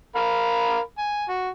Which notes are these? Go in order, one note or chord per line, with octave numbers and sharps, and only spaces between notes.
A#4 F5 B5
G#5
F#4